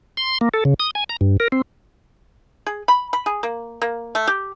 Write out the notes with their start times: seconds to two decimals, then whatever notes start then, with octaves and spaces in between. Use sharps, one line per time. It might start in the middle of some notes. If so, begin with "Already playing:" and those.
0.17 C6
0.41 A#3
0.54 A4
0.65 C#3
0.80 D#6
0.95 G#5
1.09 A#5
1.21 G2
1.40 A#4
1.52 C4
2.66 G#4
2.88 B5
3.13 B5
3.26 G#4
3.43 A#3
3.82 A#3
4.15 A3
4.27 G4